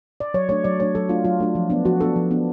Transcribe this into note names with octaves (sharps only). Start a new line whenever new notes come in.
D5
F#3 C#5
A3 D4 C#5
F#3 D5
A3 D4 C#5
F#3 A4
A3 D4 F4
F#3 F4
A3 D4
F3
B3 D4
F3 F#4
B3 D4 A4
F3
B3 D4